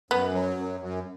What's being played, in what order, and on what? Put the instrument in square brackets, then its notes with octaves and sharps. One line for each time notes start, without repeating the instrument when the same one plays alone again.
[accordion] F#2 [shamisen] B3
[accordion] F#3
F#2
F#2